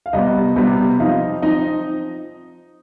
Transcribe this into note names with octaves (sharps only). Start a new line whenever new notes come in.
F5
C3 G3 B3 D#5
C3 G3 B3
F3 C4 D#4 F5
F3 C4 D#4 D#5